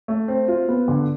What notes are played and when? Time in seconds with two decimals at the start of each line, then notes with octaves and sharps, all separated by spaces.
0.08 A3
0.28 C4
0.48 F4
0.68 B3
0.88 D3